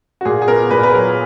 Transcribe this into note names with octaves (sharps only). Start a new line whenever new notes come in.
F#4
A#2 G#4
G#4
B3 A#4
A#2 B4
B4
F#3 A#4